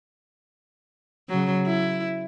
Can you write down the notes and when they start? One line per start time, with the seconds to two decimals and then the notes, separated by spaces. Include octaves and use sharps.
1.29 C#3 F#3
1.66 E4